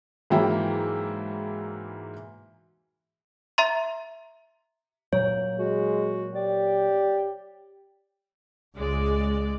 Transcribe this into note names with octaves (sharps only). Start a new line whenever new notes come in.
G#2 E3 F#3 A#3 E4 G5
E5 A#5 C6
A#2 F#3 C#5
G#3 F#4
G4 D5
C#2 G#3 D5